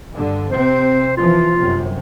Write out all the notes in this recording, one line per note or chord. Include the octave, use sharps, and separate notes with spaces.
G2 D3
C3 C4 C5
E2 E3 F3 F4
G1 F#2 C3